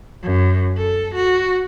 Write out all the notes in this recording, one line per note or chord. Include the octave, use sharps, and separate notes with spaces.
F#2
A4
F#4